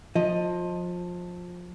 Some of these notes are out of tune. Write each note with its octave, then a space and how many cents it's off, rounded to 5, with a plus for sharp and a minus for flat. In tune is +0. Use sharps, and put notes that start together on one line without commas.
F3 +20 D#5 +0